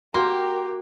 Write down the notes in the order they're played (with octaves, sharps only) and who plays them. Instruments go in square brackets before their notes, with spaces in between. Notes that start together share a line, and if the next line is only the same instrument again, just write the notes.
[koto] A#3 [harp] F#4 G5 [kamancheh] G4 A#4 [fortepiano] C6